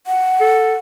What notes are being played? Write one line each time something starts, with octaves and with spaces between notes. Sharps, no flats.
F#5
A4